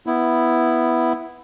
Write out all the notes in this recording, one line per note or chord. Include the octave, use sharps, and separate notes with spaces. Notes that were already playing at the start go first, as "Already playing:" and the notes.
B3 E4